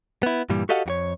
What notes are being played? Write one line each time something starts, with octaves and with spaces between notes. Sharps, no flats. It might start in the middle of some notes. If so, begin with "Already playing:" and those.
B3 E4
G2 A#2 E3 G3
F#4 G4 A4 D#5 F5 F#5
F2 F#4 C#5